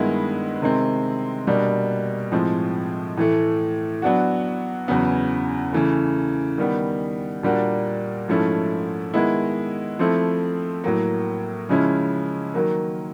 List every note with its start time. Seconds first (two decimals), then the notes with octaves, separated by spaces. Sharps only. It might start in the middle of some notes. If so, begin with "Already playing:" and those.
Already playing: G2 D#3 G#3 B3 E4
0.62 C3 D#3 G#3 C4
1.47 B2 G3 A#3 D4
2.32 A2 F3 G#3 C4
3.17 A2 E3 A3
4.02 F#3 B3 D4 F#4
4.88 E2 C#3 F#3 B3
5.73 C#3 E3 A3
6.58 D#3 G3 B3
7.43 A#2 G3 A#3 D4 F#4
8.28 G#2 F3 A3 C#4 E4
9.14 D#3 G#3 B3 E4
9.99 F3 A3 C4 E4
10.84 A2 F#3 A#3
11.69 C#3 F3 G#3 C#4 E4
12.54 D#3 F#3 A#3